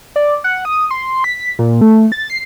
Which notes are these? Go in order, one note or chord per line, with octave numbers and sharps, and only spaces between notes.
D5
F#5
D#6
C6
B6
A#2
A3
A6
C7